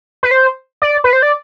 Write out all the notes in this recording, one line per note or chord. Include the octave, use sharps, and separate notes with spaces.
B4
C5
D5
B4
C5
D5